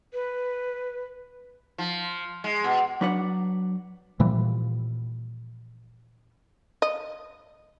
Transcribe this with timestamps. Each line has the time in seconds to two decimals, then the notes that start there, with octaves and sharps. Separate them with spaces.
0.13 B4
1.78 F3
2.44 G#3
2.64 B2
3.01 F#3 D4 B4 D5 F#5
4.20 A#2 E3 F3 G3
6.82 D#5